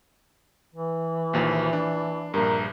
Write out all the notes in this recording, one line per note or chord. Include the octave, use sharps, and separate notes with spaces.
E3
A#1 D#2 F3
D4
A#1 G2 A#4